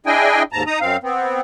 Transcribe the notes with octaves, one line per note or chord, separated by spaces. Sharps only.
D4 E4 G#4 D#5 G5 G#5
D#2 G#2 A5 A#5
D#4 A#5 D#6
F#2 C4 F5
B3 C4